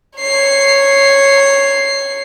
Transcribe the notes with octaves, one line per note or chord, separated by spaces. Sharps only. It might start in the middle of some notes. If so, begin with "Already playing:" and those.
C#5 C7